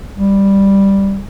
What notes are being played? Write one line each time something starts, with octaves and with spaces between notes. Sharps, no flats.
G3